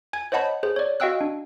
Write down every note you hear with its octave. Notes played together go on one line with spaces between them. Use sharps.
G#5 G#6
C5 C#5 D#5 F#5 A5 B5
G#4 C5
C#5 D5
F#4 D#5 F5 G5 E6 F#6
D4